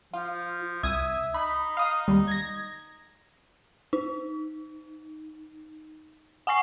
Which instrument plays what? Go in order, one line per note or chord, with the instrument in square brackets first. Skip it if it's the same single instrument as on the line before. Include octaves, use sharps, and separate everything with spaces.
[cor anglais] F3 [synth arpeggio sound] F4
[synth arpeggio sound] C2 D#6 G#6 [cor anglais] E5
[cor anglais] D#4 [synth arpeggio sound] B5
[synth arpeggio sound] F5 D#6
D#2 G3
G#6 A#6
[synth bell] D#4
F#5 G#5 C#6 C7